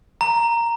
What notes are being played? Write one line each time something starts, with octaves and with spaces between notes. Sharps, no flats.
A#5